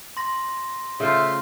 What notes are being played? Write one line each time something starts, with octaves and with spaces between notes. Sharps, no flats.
C6 A#6
C#3 A3 F4 C5 E5